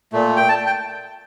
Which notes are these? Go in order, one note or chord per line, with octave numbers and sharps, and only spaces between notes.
A#2 A3
G5
A5
G5